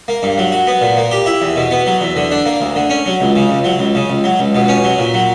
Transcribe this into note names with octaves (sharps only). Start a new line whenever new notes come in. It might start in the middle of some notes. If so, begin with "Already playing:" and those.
A#3
G2
F#3
F#4
B3
A#2
A#3
G4
E4
E2
B2
B3
F#3
E2
D3
D4
A#3
D2
D3
C#4
F#3
C#2
C#3
C#2
F#3
C#2
C#3
C#2
F#3
C#2
B2
C#4
F#3
A#2
F#3